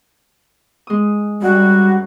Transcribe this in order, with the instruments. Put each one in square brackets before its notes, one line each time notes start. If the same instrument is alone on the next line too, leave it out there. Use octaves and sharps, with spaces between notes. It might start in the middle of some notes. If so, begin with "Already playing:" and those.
[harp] G#3 D#6
[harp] F#2 [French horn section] G3 [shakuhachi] F#4